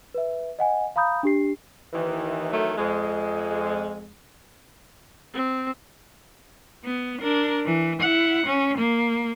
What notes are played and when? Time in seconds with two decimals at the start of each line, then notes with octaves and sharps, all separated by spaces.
0.14 B4 E5
0.59 D#5 F#5 G#5
0.96 F5 A#5 B5 D#6 G6
1.23 D4 G4 C7
1.93 D#2 D#3 E3
2.52 D#3 E3 F#3 A3
2.78 F2 G#3
5.34 C4
6.84 B3
7.22 D4 A#4
7.66 E3
8.00 E4 F#5
8.46 C#4
8.78 A#3